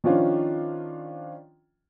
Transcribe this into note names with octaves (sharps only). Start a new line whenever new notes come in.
D#3 F3 C#4 D4 F4